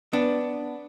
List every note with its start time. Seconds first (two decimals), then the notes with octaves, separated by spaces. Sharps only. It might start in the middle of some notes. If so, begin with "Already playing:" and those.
0.13 B3 D4